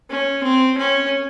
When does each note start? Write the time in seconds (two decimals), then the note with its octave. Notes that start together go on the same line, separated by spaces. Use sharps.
0.10 C#4
0.43 C4
0.78 C#4